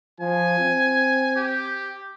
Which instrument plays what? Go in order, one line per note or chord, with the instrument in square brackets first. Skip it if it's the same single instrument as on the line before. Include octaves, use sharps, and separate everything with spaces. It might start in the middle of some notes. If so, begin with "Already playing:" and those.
[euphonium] F3 [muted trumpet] G#5
[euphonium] C4
[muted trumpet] G4